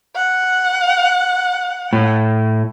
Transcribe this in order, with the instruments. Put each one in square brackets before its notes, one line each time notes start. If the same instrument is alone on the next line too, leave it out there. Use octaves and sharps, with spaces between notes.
[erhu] F#5
[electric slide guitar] A2